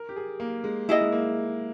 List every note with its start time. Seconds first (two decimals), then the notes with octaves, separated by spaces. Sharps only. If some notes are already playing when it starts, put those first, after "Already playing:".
Already playing: A#4
0.09 G4
0.16 G#4
0.40 A#3
0.64 G#3
0.89 A#3 E4 G#4 D#5
1.01 G#3
1.12 A#3